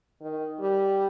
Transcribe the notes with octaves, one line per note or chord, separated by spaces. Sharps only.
D#3
G3